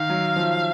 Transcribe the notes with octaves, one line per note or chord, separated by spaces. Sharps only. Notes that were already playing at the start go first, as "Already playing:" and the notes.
Already playing: D#3 F5
F#3
F3